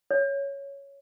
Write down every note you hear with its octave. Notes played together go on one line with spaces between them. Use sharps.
C#5